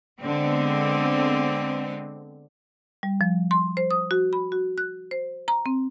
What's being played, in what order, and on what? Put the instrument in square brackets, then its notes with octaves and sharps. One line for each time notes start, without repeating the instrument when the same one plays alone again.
[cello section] D3 G#3 B3 C4
[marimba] G3
F3
C6
C5
D#6
F#4
B5
F#4
F#6
C5
A#5
C4